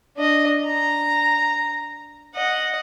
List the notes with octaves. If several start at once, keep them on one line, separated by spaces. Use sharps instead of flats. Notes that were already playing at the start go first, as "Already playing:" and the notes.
D4 D#5
A#5
D#5 F#5